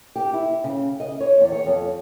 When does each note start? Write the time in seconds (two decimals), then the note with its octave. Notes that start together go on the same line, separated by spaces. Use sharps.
0.16 G4
0.34 E4
0.64 C#3
1.00 D#5
1.21 C#5
1.41 E2
1.52 C#5
1.66 F2